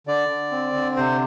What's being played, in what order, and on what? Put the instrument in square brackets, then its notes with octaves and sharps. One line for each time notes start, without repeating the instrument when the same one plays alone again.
[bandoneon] D3 D5
D3
C4
D3
C3 C5